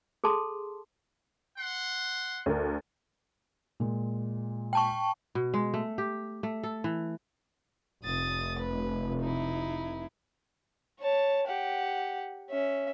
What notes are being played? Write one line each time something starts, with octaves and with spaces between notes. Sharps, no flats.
G#4 A4 A5 C6
F#5 C6
D2 D4 A#4
A#2 G#3
G5 A5 C#6
B2
G#3
A3
G4
A3
A4
E3
F1 D#6 A6
B4
D#4 E4
C#5 A5
G4 F#5
C#4 E5